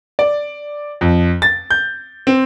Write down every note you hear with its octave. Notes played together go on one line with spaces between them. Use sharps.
D5
F2
A6
G6
C4